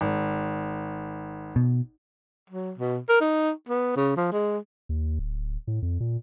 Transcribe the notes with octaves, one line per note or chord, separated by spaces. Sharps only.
G#1
B2
F#3
B2
A#4
D#4
B3
C#3
F3
G#3
D#2
D1
A2
F2
A#2